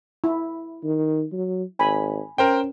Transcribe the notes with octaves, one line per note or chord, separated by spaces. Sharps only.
E4
D#3
F#3
G#1 G#5 B5
C#4 A#4 C5 G5